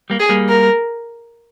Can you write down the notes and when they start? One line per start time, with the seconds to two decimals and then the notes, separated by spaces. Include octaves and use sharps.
0.10 G3 A#3
0.20 G#4
0.29 G3 A#3
0.48 A#4